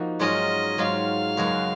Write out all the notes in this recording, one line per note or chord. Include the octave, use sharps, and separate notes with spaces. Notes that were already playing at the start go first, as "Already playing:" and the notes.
Already playing: F3 A#3 D#4 F#4
G#2 F#3 C#4 F4 D#5
G#2 F#3 C#4 F4 F5
F#2 C#3 G#3 B3 F#4